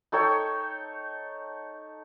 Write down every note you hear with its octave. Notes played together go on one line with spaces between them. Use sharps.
D#4 A4 C#5 G5